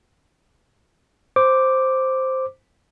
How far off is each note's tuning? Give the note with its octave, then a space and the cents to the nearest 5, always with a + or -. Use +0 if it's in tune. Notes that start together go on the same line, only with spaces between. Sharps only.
C5 +0 D6 +0